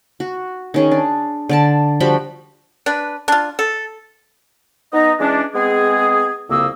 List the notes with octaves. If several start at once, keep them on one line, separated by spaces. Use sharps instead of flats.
F#4
D#3 C#4 G#4
D4
D3 D5 A5
F3 G3 F#4 B5
D4 B4
D4 F4
A4
B3 D#4 D#5
E3 G#3 C#4 D4
G#3 B3 C4 G#4
C2 F2 C#3 A#3 D#6 E6